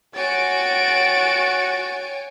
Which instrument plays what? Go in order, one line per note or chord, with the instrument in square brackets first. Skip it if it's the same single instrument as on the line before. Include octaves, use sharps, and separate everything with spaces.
[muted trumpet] F#4 [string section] C#5 G5 G#5 [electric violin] A6 D7